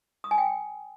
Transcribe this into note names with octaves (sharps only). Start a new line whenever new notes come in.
D#6
G#5
G5